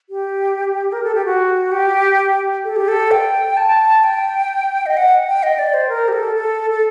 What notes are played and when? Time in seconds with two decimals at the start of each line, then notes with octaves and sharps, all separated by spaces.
0.10 G4
0.92 A#4
1.04 A4
1.15 G4
1.25 F#4
1.71 G4
2.65 A4
2.76 G4
2.88 A4
3.11 G5
3.57 A5
4.04 G5
4.86 D#5
4.97 F#5
5.27 G5
5.43 D#5
5.59 D5
5.74 C5
5.89 A#4
6.08 G4
6.13 A4
6.36 A4
6.71 A4